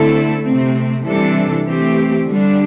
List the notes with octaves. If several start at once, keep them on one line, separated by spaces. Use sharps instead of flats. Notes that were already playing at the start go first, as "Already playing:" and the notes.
Already playing: D3 A3 C4 E4 A4
C3 A3 C4
C3 E3 G3 D4 A4
E3 A3 C4 G4
D3 G3 D4